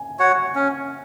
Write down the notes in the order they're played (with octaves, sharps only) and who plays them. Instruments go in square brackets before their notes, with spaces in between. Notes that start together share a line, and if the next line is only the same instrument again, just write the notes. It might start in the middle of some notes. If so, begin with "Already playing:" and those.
Already playing: [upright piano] G#5
[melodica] F#4 C#5 F#5
C#4